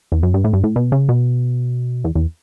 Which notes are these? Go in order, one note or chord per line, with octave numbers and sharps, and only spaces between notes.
E2
F#2
G2
A2
G2
A2
B2
C#3
B2
E2
E2